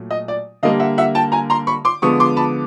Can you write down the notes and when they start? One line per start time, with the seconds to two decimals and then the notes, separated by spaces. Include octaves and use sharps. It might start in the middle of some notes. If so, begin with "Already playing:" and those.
Already playing: A#2 F#3 A3
0.11 D#5
0.28 D5
0.63 D3 G3 A#3 D#5 F5
0.80 E5 F#5
0.98 E5 F#5
1.15 G5 A5
1.32 G#5 A#5
1.50 A#5 C6
1.67 B5 C#6
1.85 C6 D6
2.02 D3 F3 G#3 B3 C#6 D#6
2.20 C6 D6
2.37 A5 B5